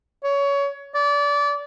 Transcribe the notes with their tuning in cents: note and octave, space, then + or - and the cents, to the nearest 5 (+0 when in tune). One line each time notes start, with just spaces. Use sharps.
C#5 +20
D5 -25